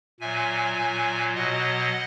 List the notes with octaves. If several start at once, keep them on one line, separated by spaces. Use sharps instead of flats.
A#2 F#3 E5 G#5
A#2 F#3
B2 F#3 D#5 F#5